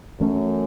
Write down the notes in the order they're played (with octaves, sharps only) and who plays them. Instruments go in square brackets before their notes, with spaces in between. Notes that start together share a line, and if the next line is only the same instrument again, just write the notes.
[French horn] F#2 [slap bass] E3 A3 C#4